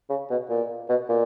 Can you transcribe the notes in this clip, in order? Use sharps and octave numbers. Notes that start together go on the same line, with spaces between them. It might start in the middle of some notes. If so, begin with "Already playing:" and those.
C#3
B2
A#2
B2
A#2